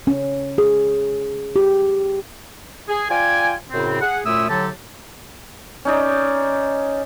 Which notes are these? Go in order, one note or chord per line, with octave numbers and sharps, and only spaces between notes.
C#4
G#4
G4
G#4
F4 D5 G5 G#5
F#2 A2 C#3 C4
G#4 F#5
F#2 A#2 A3 E4 D#6 E6
A2 D3 F#3 G4 A4 A5
C#4 D#4 D5